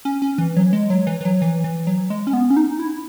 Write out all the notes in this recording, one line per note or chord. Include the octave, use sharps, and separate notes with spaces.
C#4
C#4
E3
F#3
G#3
F#3
E3
E3
F#3
E3
E3
F#3
G#3
C#4
B3
C#4
D#4
E4